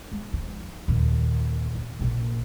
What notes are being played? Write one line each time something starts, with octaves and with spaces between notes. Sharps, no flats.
G#3
F3 D#4
D#2 A#2
E2
A#1 A#2